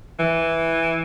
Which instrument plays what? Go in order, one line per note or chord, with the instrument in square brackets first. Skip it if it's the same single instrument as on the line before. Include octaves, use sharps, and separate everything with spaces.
[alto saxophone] E3